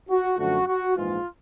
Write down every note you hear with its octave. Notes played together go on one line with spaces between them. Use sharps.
F#4
F#2 D3 F3 A3 F#4
F#4
A#1 G#2 E3 G#3 F4